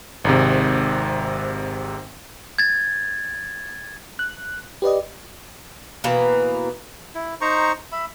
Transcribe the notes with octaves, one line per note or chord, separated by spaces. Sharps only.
G#1 G#2 C3
G#6 A6
F#6
G4 B4 D5 D#5
B2 E3 A#3
E4
D#4 C5 A#5 C#6
E5 B5